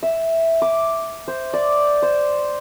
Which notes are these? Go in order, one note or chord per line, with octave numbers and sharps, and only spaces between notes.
E5
D6
C5
D5
C5